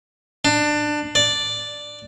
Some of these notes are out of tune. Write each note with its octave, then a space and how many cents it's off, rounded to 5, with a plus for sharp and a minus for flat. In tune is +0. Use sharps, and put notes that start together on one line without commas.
D4 +20
D5 +0